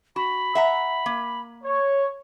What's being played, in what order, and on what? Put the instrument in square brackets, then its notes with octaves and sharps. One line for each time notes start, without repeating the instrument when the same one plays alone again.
[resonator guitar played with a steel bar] F#4 [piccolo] B5
[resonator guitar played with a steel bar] E5 F#5 A#5
A#3
[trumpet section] C#5